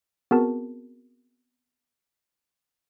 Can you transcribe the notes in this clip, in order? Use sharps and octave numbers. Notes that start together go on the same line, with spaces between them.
B3 C4 F#4 G#4 A#4 A5